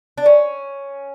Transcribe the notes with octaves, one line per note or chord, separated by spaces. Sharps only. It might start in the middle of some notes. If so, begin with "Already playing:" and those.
D4
C#4